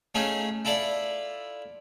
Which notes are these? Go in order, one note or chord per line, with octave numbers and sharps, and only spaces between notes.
A3 C#4 D#4 F4 G#4
E4 F4 A4 D5 E5